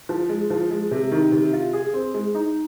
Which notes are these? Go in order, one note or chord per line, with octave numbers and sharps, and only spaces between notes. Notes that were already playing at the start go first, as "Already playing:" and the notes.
F3
G#3
F3
G#3
C3
D#3
C3
F4
G#4
C4
G#3
D#4